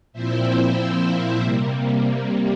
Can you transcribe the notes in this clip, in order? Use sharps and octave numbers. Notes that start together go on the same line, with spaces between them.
A#2 F3 C4 E4 C5 E5
C3 G3 A#3